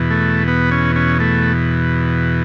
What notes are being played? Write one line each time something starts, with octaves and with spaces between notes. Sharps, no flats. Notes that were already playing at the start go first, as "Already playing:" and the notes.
Already playing: E2 B2
A3
B3
C#4
C#4
A3